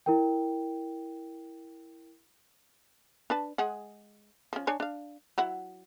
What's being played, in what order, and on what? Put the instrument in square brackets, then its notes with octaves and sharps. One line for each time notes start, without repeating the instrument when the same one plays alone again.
[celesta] E4 A#4 G5
[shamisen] D4 B4 A5
G#3 G#4 F#5
F3 C#4
D4 C#5 G#5
D4 F5
F#3 E4 F#5